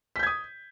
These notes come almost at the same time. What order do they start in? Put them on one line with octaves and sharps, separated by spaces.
B6 G6 G#6 D#6